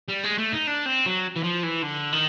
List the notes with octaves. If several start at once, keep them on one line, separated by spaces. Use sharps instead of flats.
G3
G#3
A3
D#4
D4
C4
F#3
E3
F3
E3
D3
D#3